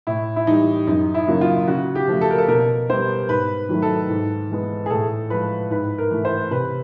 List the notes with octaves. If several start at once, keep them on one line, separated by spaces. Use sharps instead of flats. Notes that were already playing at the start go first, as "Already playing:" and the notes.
A2 E4
E4
E3 G3 D#4
F#2 D#4
E4
C#3 F#3 A#3
F4
C#3 F#4
G4
F3 A3
A4
A#4
A4
B2 A#4
G3 B3 C5
G#2 B4
D#3 F#3 A3
A4
G#2
E3 G#3 B3
G#4
A2 A4
F3 G#3 B4
G#2 B4
A#4
E3 A3
C5
C3 B4